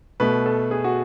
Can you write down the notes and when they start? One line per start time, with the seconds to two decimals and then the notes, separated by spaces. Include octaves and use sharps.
0.20 B2 A3 B4
0.46 A4
0.71 G#4
0.84 F#4